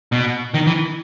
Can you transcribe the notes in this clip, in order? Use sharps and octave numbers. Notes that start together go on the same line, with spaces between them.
B2
D#3
E3